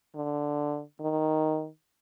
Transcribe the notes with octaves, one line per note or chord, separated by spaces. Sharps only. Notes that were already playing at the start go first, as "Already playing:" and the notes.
D3
D#3